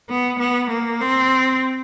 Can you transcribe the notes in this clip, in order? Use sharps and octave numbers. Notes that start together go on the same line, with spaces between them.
B3
B3
A#3
C4